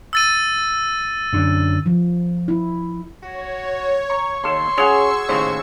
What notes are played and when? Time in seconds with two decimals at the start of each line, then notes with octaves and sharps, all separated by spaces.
0.13 E6 A6 D#7
1.33 F#2 D3
1.86 F3
2.48 E4
3.23 F#4 C#5
4.10 A#5 C#6
4.44 D#2 A4 C6 C#6 E6 C#7
4.78 C#4 F#4 G#4 C#5
5.29 D#2 A2 C#3 C5